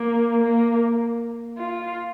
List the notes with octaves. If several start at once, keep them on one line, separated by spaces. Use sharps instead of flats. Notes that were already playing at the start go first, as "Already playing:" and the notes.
Already playing: A#3
A#3
F4